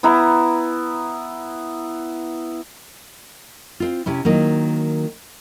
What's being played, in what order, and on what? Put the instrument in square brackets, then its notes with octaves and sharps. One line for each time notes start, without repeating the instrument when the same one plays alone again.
[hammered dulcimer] B3 E4 A#5
[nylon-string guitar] C4 F4
C3 C#4 E4
D#3 F#3 A#3